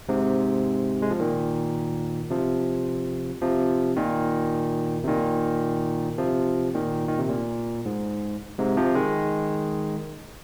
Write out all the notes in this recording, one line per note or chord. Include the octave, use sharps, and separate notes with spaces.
G#2 C3
G#3
F3
A#2 D#3
C3 F3
C3 F3
A#2 D#3
C3
A#2 D#3
C3 F3
A#2 D#3
D#3
C3
A#2
G#2
G#2 C3
C3 F3
D#3 G#3